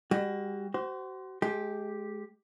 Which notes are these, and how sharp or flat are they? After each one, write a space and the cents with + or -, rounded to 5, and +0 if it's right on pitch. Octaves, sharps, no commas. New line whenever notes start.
G3 +40 F#4 +25
F#4 +35 C5 -15
G#3 +25 G4 +0